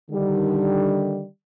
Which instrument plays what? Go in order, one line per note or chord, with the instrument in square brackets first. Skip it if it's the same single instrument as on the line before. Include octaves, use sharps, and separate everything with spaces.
[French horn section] D3 D#3 G3